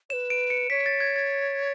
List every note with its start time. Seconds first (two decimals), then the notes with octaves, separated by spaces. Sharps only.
0.10 B4 C#5 E7
0.30 D7
0.50 C#7
0.70 C#5 B6
0.86 A6
1.00 G#6
1.16 A6